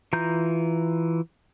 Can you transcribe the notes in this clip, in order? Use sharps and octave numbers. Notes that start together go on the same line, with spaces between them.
E3 F4 A#5 G6